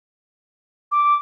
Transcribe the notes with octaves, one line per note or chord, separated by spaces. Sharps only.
D6